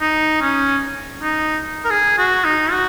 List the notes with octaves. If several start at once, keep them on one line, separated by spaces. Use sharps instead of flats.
D#4
C#4
D#4
A#4
G#4
F#4
D#4
F#4